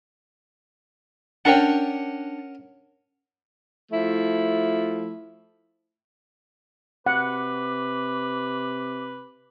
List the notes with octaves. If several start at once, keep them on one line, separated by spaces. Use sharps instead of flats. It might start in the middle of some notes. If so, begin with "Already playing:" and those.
C#4 D4 A#4 F#5 G5
F3 A3 E4
C3 B4 F#5 D6